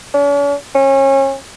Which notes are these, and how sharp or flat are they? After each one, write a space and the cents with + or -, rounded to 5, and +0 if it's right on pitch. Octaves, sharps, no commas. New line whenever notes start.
C#4 +45
C#4 -30